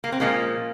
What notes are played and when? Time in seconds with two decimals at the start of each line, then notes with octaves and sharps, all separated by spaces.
0.04 A#3
0.12 C4
0.20 A#2 F3 G#3 A#3 C#4